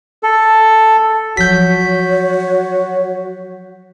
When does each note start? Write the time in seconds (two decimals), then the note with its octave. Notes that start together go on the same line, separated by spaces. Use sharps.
0.23 A4
1.37 F3 F#3 F#4 C#5 G6 B6